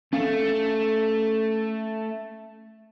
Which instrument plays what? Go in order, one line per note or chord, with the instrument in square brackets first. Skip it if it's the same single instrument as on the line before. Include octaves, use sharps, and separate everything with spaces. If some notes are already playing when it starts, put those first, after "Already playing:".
[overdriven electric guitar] A3 [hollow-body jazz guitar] C#4 F5